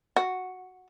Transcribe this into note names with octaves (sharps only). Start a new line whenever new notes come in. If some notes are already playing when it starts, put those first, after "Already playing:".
F#4